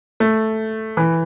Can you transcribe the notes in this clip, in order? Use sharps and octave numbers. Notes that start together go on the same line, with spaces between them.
A3
E3